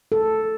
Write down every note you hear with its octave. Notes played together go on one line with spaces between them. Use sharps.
A4